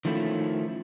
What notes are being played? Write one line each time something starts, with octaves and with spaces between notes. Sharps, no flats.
D#3 F3 A3 C#4 E4